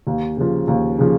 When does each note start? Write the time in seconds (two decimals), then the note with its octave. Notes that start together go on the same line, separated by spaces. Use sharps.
0.07 D#2
0.37 C#3 F3
0.68 D#2
0.98 C#3 F3